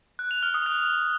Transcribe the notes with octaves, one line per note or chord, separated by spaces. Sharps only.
F#6
F7
F6
D#6
F#6